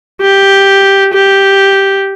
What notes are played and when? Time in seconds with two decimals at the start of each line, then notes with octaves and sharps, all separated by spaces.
0.21 G4
1.13 G4